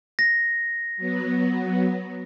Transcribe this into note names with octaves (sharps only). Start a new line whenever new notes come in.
A#6
F#3 B3